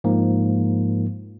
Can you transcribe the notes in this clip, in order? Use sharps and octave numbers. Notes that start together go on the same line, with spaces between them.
G#2 F3 A#3